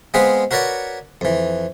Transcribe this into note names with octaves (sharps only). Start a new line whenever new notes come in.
G#3 B3 C4 G#4 B4 F5
F#4 A#4 B4 C#5 D5 F#5
F2 E3